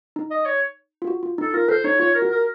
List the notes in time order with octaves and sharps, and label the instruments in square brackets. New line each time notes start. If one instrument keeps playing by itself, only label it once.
[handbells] D#4
[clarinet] D#5
C#5
[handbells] F4
F#4
F4
D#4
[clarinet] A4
[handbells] F4 [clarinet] A#4
[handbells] A4 [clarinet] C5
[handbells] D#4 [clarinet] C#5
[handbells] F4 [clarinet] C#5
[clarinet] A#4
[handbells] F#4
[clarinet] A#4